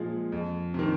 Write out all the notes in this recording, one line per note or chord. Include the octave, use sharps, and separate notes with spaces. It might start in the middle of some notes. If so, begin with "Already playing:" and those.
Already playing: A#2 F3 G#3
F2
C3 D#3